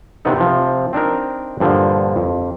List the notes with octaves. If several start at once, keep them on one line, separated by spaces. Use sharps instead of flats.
C3 D#3 B3 D4 D#4 A4
C3 F3
C4 D4 D#4 A#4
G2 A#2 D3 F3
F2